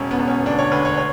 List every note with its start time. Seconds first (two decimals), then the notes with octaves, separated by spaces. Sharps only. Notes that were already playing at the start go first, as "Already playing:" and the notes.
Already playing: E1 C#4
0.11 B3
0.19 E1
0.28 C#4
0.46 D2 D4
0.59 C#5
0.72 D2 B4
0.85 C#5
0.98 C#5